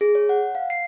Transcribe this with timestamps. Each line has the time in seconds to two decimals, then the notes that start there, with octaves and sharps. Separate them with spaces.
0.01 G#4
0.15 C#5
0.29 F#5
0.55 F5
0.70 C7